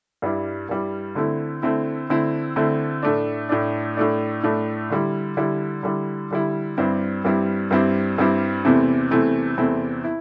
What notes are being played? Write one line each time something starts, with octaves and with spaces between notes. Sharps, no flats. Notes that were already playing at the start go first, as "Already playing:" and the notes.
G2 G3 E4
G2 G3 E4
D3 A3 C4 E4
D3 A3 C4 E4
D3 A3 C4 E4
D3 A3 C4 E4
A2 A3 D4
A2 A3 D4
A2 A3 D4
A2 A3 D4
D3 G3 E4
D3 G3 E4
D3 G3 E4
D3 G3 E4
G2 G3 C4 E4
G2 G3 C4 E4
G2 G3 C4 E4
G2 G3 C4 E4
E2 C3 A3 C4 E4
E2 C3 A3 C4 E4
E2 C3 A3 C4 E4
E4